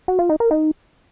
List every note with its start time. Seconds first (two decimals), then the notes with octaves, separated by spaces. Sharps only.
0.08 F#4
0.19 F4
0.29 D#4
0.40 A#4
0.51 D#4